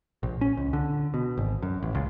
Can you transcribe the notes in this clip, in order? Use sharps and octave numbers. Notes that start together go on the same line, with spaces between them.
A#1
C#4
C#2
D3
B2
G#1
F#2
A1
C#2